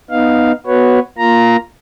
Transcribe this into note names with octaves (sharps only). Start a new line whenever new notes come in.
B3 D#4 F5
B3 F#4 B4 C#5
A#3 F4 A#5